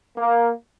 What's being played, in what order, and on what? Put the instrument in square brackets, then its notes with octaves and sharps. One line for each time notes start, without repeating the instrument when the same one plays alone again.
[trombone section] A#3